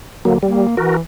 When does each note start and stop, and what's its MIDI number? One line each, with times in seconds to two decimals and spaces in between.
0.25 0.36 50
0.25 0.38 54
0.25 0.38 58
0.43 0.67 55
0.43 0.75 58
0.77 1.00 52
0.77 0.96 66
0.77 0.96 70